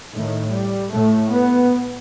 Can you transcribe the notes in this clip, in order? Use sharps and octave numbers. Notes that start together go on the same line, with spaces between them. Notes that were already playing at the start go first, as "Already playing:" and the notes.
A2 D#3
G3
A2 A3
B3